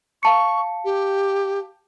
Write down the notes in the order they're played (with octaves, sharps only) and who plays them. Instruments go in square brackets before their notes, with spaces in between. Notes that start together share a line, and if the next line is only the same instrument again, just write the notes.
[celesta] F5 A5 C#7 [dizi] C#6
[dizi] G4